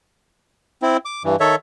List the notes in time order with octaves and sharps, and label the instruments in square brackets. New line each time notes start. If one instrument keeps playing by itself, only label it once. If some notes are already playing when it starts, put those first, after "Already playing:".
[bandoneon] C4 E4
D6
G2 E3
D#3 A4 C#5 E5